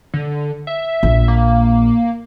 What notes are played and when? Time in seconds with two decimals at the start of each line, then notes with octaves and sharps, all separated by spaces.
0.14 D3
0.67 E5
1.03 A#1
1.28 A#3